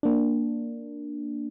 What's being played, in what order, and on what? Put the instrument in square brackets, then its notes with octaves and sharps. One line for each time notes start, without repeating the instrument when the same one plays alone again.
[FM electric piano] A#3 D4